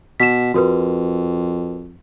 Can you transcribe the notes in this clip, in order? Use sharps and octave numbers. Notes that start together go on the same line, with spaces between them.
B2 B6 E7
F2 F#4 A#4 B4